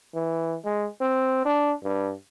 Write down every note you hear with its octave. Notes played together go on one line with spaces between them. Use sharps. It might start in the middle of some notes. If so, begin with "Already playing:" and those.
E3
G#3
C4
D4
G2